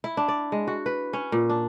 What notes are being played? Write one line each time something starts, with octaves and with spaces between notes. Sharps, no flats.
E4
D4
D5
G#3
F#4
B4
C#4
A#2
D4